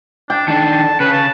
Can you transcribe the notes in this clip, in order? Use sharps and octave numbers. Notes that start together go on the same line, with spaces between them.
D4 G5
D#3 D4 A5
C#3 B4
A5